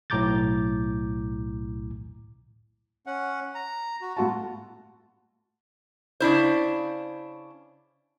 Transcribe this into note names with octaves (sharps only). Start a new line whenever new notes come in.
B1 A2 A#5 D6 G6 A6
C#4 F#5
A#5
F#4
A2 F4 F#4 A5
C#3 D4 E4 C5